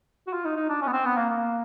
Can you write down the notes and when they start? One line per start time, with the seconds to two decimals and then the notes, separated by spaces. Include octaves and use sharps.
0.27 F#4
0.33 F4
0.45 D#4
0.56 D#4
0.69 D4
0.81 C#4
0.87 B3
0.92 C4
1.06 B3
1.17 A#3
1.30 A#3